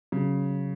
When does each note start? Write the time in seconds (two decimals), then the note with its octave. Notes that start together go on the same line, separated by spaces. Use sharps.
0.12 C#3 F#3